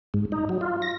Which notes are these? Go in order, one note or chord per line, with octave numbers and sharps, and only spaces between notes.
G#2
D#4
F#3
F4
A#6